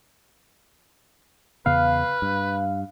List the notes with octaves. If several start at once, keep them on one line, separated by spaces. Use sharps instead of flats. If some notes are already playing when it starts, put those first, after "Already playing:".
E2 C#3 B3 B4 F5
G2